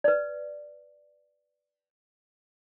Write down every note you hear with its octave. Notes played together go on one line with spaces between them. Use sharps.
B4 D5